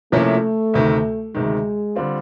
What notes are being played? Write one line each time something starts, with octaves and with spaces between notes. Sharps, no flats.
C3 F3 A3 A#3 C#4 E4
D2 C3 D#3
D2 C3 D#3 G#3
D3 G3 C4 F4